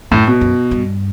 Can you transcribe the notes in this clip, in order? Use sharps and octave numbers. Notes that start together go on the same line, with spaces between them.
F#2 A2
B2
F#2
G2